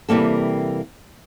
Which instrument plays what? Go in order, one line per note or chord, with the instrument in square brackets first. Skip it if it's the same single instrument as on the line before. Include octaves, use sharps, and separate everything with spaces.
[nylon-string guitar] C3 E3 G3 A#3 A4